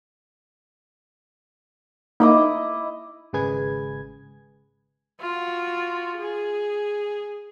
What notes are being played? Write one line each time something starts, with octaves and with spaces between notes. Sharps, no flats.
A#3 D#4 E4 D#5 D6
G#1 C#3 G#3 G#4 B4 G#6
F4 F#4
G#4